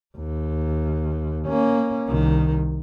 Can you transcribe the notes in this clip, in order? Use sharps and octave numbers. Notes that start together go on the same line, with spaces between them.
D#2
A#3 C#4
C2 D#3